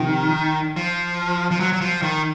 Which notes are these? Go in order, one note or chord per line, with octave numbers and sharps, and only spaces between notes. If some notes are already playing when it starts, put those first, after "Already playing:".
Already playing: C3 D#3 F3
F3
F3
F#3
F#3
F3
D#3